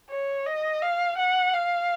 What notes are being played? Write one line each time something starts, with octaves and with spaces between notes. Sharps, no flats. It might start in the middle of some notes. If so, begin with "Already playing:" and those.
C#5
D#5
F5
F#5
F5